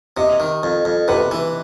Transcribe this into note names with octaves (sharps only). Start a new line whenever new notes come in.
C3 D#5
D#3
F2
F2
C3 B4
E3